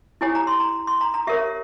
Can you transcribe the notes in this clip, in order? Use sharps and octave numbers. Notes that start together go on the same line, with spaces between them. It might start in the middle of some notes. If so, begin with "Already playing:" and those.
E4 G4 C#5 G#5
A#5
C6
A#5
C6
A#5
A#5
G4 A#4 C#5 E5